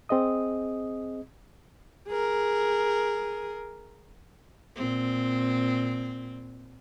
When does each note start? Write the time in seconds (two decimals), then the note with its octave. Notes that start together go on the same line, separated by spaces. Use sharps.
0.09 C4 G#4 D#5 D#6
2.08 G#4 A#4
4.76 A#2 C4